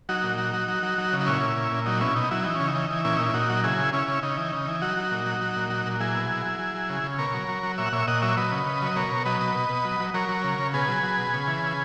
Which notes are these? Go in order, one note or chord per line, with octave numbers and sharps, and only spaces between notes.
F#3 D#4 F#4
A#2
F#3
F#3
F#3
F#3
F#3
C#3
D#4
A#2 C#4 E4
A#2
A#2
A#2
F#3 D#4
B2 C#4 E4
B2 D#4
F#3 E4
E3 D#4
C#3 C#4
D#4
E3
E3
A#2 C#4 E4
A#2 D#4
E4
A#2 D#4 F#4
F#3
C#3 E4 G#4
C#3
C#3 C#4 E4
C#3
C#3 D#4
E3
C#3
E3
F#3 D#4 F#4
F#3
A#2
F#3
F#3
A#2
F#3
A#2
F#3 E4 G#4
B2
F#3
F#3
F#3
F#3
C#3
C#3
B2 A#4 C#5
F#3
F#3
F#3
A#2 C#5 E5
F#5
A#2 C#5 E5
A#2 D#5 F#5
F#3 C#5 E5
F#3 B4 D#5
C#3
C#3
F#3 D#5
B2 A#4 C#5
B2
F#3 B4 D#5
B2
B2
B2
F#3
F#3
F#3 A#4 C#5
F#3
C#3
C#3
B2 G#4 B4
F#3
F#3
B2
C#3
E3
C#3